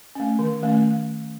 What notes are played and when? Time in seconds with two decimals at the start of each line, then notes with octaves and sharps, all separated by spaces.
0.15 A3 C#4
0.39 D#3
0.63 A3 C#4